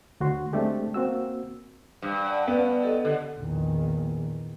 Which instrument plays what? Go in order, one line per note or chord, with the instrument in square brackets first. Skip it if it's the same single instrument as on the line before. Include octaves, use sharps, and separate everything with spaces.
[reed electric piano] D2 F#4 C6
G#3 A3 C4 D4 G4 A4
A#3 C4 F#4 E6
[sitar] G2
[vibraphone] D5 F#5 A5
[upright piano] B3
[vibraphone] G4 A4 D#5
[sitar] D3
[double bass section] A#1 E2 D#3